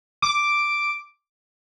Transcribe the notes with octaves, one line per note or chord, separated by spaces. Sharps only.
D6